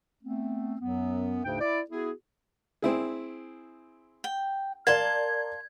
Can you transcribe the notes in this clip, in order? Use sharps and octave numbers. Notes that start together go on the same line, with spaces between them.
A3 B3 C4
F#2 F#3 B3
D2 G#2 C#3 D4 G5
E4 D5
B3 E4 F#4 G#4
C4 E4 G#4
G5
A#4 D5 F5 A5 C6 G#6